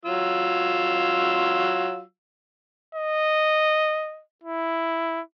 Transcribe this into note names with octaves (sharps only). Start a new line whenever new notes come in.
F#3 F4 E6
D#5
E4